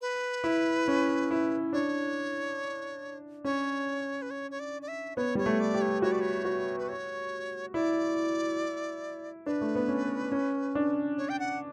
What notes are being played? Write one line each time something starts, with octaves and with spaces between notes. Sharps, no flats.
B4
E4
C#4
E4
D4 C#5
C#4 C#5
B4
C#5
C#5
D5
D5
E5
B3 C#5
G3 C#5
A3
D5
G4
C#5
F#4 C#5
D5
C#5
F#4
B4
C#5
E4 D5
D4 B4
A3
B3
C#4
C#4
D4
C#5
G5
F#5